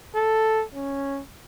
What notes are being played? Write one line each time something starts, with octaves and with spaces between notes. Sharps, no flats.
A4
C#4